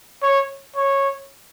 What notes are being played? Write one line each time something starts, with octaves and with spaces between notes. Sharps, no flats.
C#5
C#5